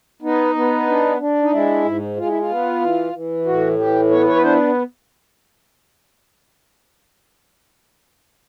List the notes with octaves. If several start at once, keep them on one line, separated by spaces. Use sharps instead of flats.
B3 D#4
B3
D4
D4
D#4
G#3 E4
G#2
G#3 F4
E4
F4
B3
E3
E3
A2 F#4
E3 G4
B3 C#5
C#5
B4
D4 C5